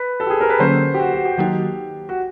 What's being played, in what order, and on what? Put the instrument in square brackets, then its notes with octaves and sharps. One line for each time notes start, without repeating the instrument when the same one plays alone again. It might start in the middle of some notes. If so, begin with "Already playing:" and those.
Already playing: [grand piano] B4
A4
G4
G#4
A#4
B4
[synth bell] D3 F#3 A#3 C#4 [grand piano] C5
[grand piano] G4
F#4
F#4
G4
[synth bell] D#3 F#3 A#3 D#4 F#4 [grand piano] G4
[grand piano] F#4